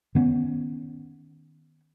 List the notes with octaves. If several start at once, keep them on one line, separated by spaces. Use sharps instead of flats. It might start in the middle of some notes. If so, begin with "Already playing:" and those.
D#3 B3 C#4